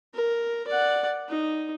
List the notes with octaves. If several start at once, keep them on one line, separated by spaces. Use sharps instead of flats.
A#4
D5 F#5
D#4